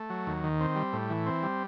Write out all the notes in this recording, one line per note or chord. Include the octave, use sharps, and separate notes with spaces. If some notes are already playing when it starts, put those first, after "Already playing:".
Already playing: A3
F#3
D#2
D#3
C4
G3
A2
E3
C4
G3